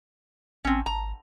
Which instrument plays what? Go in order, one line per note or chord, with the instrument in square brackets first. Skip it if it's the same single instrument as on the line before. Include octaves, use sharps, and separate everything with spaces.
[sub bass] A1 [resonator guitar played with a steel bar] C4 C#4
[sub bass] G#1 [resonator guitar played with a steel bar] A#5